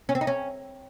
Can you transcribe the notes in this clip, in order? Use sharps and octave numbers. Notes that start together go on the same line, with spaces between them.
C#4
C4
D#4
C#4